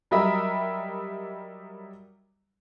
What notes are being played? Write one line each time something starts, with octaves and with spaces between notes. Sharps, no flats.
F#3 G3 A#4 D#5 E5 B5